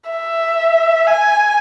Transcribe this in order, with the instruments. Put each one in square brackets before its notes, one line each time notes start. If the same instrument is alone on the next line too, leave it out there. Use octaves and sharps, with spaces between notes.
[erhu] E5
G#5